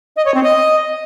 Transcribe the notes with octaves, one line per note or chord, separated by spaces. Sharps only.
D#5
C#5
C4
D#5